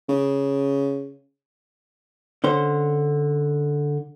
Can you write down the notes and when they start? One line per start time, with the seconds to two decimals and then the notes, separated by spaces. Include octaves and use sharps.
0.09 C#3
2.44 D3 C#4 C5